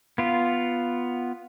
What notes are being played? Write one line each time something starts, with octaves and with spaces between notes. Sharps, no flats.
B3 F4